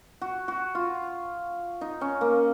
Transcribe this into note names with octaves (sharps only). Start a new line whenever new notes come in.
F#4
F#4
F4
D#4
C#4
A#3